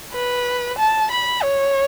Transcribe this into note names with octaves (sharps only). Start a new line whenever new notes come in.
B4
A5
B5
C#5